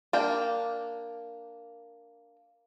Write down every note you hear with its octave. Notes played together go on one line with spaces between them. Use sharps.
A#3 D4 G5